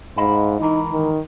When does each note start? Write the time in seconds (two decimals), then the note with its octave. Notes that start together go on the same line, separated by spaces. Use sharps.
0.17 G#2 D#5 F5 B5
0.60 G#2 E3 D#4 A#4
0.91 D#3